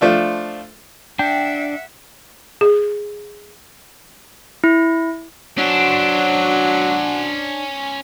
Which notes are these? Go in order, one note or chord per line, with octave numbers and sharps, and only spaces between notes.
F3 A3 D4 F4
D4 E5 F#5 G5
G#4
E4
F#3 C#4 D4 F#4 C5